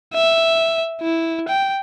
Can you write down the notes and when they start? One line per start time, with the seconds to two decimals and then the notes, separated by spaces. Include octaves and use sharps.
0.14 E5
1.01 E4
1.48 G5